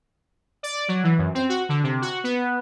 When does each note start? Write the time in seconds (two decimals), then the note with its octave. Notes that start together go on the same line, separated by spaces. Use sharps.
0.63 D5
0.88 F#3
1.04 E3
1.18 F#2
1.35 C4
1.49 F#4
1.69 D3
1.84 C3
2.02 F#4
2.24 B3